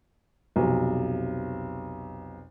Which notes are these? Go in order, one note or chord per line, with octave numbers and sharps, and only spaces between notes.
B1 F2 C3